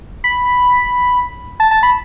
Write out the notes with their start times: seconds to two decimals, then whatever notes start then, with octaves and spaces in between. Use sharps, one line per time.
0.24 B5
1.60 A5
1.71 A5
1.83 B5